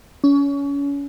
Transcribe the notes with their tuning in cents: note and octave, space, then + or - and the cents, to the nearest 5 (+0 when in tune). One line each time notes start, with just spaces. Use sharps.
C#4 +30